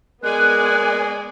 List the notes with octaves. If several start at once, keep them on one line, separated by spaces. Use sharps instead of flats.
G#3 B3 A#4 D5 G#5 F#6